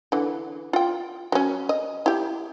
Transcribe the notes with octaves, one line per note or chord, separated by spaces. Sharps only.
D3 E3
F4 G5
F#3 C#4
D#5
E4 G4